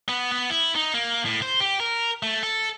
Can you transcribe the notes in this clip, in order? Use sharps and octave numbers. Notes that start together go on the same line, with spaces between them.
B3
B3
E4
D#4
A#3
A2
C5
G4
A#4
A3
A4